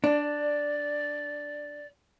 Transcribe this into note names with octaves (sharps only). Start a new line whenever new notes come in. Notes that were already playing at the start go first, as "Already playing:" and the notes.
D4 D5